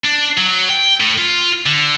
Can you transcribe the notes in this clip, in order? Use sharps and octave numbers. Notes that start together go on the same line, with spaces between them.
D4
F#3
G5
A2
F4
D3